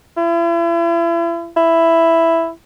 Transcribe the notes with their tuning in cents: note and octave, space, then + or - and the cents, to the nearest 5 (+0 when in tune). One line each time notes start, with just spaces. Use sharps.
E4 +40
E4 +5